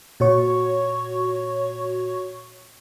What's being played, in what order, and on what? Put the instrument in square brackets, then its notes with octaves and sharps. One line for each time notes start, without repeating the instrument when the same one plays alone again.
[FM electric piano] A#2 F#4 C#5 C#6